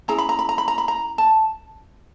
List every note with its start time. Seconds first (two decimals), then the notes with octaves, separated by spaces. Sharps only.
0.08 C#4 E4 G#4 A#5
0.18 B5
0.29 A#5
0.39 B5
0.49 A#5
0.58 B5
0.68 A#5
0.78 B5
0.88 A#5
1.18 A5